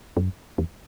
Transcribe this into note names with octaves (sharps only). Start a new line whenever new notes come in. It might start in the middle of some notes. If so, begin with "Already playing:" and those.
F#2
E2